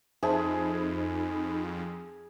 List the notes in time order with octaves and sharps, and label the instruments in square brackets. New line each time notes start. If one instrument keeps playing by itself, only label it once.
[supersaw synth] F2 [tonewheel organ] D#4 B5 [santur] G#4 [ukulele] C5 E5 A5